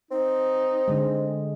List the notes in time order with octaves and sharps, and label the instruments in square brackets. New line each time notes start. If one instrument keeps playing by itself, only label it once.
[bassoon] C4 [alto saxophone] D#4
[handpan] D3 G#3